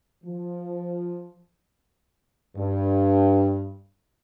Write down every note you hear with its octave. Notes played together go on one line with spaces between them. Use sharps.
F3
G2